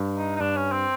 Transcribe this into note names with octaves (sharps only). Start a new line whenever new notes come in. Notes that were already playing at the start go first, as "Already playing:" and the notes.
Already playing: G2
D#4
D#4
G2 D4
C#4
C4